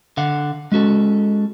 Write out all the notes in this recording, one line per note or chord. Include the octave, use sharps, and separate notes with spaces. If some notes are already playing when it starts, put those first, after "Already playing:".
D3 F5 F#5
G#3 C#4 F#4 A4